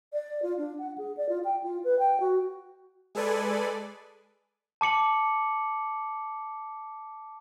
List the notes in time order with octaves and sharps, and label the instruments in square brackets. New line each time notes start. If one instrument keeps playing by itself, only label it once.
[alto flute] D5
F4
D4
F#5
G#4
D5
F4
G5
F4
B4
G5
F#4
[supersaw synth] G#3 G#4 A4 B4 D5 G#5
[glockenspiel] A5 D6 C#7 F#7